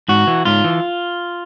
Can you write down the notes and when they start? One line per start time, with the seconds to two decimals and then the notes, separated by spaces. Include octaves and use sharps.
0.08 G#2 F#4
0.27 E3
0.45 G#2 F4
0.64 E3